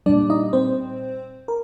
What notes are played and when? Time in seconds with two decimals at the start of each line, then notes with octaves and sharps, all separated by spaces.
0.06 A#2 G3 D4 D5
0.30 D#4 D#5
0.53 C4 C5
1.48 A#4